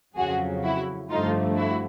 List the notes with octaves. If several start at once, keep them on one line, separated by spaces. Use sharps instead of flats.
F2 C#3 F#3 F#4 G#4
E4 F#4
G2 D3 F3 A3 D#4 F4
E4 F#4